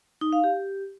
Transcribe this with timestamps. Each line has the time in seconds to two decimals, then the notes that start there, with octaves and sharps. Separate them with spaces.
0.21 D#4
0.33 F5
0.44 G4